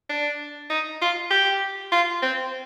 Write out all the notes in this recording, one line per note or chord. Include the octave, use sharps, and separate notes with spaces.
D4
D#4
F4
G4
F4
C4